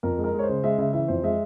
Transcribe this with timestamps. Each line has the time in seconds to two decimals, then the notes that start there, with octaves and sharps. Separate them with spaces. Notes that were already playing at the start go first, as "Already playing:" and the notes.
0.03 F2 A#4
0.19 G#3
0.24 A#4
0.34 G#3 C#5
0.43 C5
0.49 C#3
0.64 G#3 E5
0.78 C#3 E5
0.93 E3 E5
1.08 F2 C5
1.23 G#3 E5